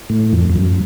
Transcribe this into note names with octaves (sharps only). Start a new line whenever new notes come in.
A2
F2
F2
F#2